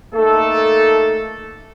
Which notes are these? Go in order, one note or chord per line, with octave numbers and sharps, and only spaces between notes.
A3 A#3 D#4 A4